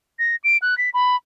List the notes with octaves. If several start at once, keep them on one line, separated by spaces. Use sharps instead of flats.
A#6
D7
F#6
B6
B5